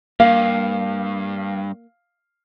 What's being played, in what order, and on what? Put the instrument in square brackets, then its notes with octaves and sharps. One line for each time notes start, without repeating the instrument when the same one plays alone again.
[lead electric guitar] G2 [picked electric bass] A#3 [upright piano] F5